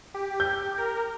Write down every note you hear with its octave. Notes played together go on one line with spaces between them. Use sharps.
G4
G6
A#4